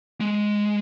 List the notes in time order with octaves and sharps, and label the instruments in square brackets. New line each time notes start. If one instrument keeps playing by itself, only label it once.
[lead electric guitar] G#3